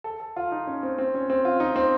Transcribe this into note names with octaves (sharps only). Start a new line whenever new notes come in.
A4
A4
F4
D#4
C#4
C4
C4
C#4
C4
F4
D#4
C4